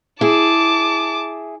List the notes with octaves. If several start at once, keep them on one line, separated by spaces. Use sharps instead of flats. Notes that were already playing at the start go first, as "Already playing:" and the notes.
E4 G#4 A5 D6